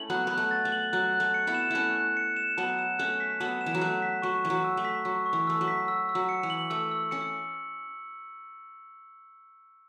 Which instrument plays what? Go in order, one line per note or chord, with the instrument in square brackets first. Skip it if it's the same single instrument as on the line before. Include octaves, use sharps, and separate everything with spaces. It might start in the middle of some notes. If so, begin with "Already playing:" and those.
Already playing: [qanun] A3 C#4 E4 [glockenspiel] F#7
[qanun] F#3 B3 [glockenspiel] F#6
[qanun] B3 [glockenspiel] F#6
[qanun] A3
[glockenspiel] A6
[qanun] A3
[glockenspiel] F#7
[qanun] F#3 [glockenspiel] F#6
[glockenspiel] F#6
[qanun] A3
[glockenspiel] C#7
[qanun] B3 E4
[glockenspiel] E7
[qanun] A3 C#4 E4 [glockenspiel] F#6
[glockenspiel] F#6
C#7
E7
[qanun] F#3 B3 [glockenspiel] A5
[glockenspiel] E7
[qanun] A3 C#4 [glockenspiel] F#6
[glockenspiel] B6
[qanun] F#3 B3 [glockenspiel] A5
[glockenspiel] E7
[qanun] E3
F#3
[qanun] A3 [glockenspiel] F#6
[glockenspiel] B6
[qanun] F#3 [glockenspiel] C#6
[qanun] E3 [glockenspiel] C#6
[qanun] F#3
[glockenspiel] E6
[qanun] A3
[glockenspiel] B6
[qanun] F#3 [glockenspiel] C#6
[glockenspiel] C#6
[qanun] E3
[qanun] A3 [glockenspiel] E6
[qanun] F#3
[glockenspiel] B6
E6
E6
[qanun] F#3
[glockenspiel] C#7
[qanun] E3
[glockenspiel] F#7
[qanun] A3 [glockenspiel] E6
[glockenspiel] E6
[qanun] C#4 [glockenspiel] C#7